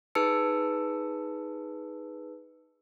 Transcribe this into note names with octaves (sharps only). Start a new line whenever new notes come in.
D#4 G#4 B4 A5 E6 C#7